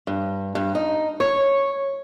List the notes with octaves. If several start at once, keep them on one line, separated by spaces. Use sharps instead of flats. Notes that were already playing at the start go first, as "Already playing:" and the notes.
G2
G2
D#4
C#5